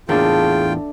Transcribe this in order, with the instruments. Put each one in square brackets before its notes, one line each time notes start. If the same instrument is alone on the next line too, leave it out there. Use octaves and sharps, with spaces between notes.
[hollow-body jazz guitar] E2 A2 A#3 [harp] A3 D4 [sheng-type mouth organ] F4 G5 [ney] G#4